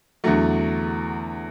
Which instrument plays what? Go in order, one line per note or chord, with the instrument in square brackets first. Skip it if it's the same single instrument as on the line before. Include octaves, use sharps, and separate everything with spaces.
[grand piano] E2 D3 F#3 A3